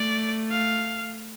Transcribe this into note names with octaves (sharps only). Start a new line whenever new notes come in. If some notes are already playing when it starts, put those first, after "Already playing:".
Already playing: A3 D5
F5